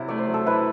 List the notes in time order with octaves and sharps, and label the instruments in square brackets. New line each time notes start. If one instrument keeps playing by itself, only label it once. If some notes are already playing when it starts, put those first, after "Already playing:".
Already playing: [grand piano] C3 F#3 E4
[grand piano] A3 [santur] D5
[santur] C5
[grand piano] F#3
[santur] A4
[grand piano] E4 [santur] B4